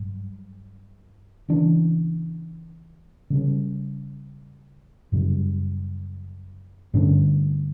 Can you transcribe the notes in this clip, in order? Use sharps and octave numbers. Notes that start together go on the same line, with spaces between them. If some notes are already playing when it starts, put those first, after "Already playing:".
Already playing: G2 F#3
C#3 E3 B3 D4
C#3 G3 C#4
F#2 C#3 G3
G2 D3 A3 C#4